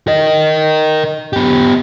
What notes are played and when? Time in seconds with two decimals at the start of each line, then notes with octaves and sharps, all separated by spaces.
0.07 A#4 D#5
1.33 B3 G4